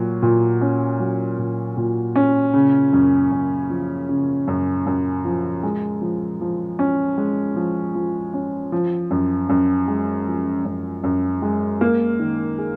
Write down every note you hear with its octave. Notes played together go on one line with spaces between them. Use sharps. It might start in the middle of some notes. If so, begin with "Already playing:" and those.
Already playing: A#2 F#3
A#2
C#4
F#3
A#2
A#2
C#4
C#3
F#2
F#2
F3
C#3
F#2
F#2
F3
G#3
F3
F3
C#4
G#3
F3
F3
C#4
F3
F#2
F#2
G#3
F3
F#2
F#2
G#3
A#3
D#3
G#4